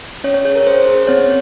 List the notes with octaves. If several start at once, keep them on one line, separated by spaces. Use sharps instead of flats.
C#4 C#5
C#5
G#4 C#5
A#4
C#4 C5
G#4
C4 C#5